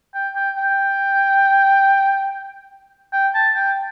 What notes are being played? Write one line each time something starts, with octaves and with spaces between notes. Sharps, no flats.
G5
G5
G5
G5
A5
G5